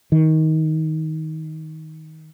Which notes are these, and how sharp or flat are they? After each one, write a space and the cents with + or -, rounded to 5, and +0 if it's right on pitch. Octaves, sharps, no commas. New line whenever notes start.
D#3 +20